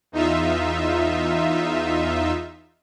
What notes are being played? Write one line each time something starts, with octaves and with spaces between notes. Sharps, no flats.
E2 D#4 F4 E5